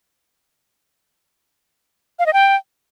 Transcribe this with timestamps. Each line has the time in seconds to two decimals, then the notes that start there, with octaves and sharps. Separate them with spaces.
2.19 F5
2.26 D#5
2.33 G5